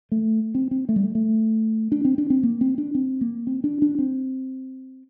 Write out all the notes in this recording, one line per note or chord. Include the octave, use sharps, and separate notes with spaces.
A3
C4
C4
A3
G3
A3
A3
D4
C4
D4
C4
A#3
C4
D4
C4
A#3
C4
D4
D4
C4